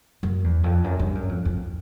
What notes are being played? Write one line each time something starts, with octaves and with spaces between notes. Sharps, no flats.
F#2
E2
F2
F#2
G2
F#2
F2
F2